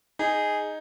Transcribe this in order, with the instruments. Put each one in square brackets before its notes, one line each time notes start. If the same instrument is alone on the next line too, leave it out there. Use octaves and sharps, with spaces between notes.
[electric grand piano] D#4 [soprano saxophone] G#4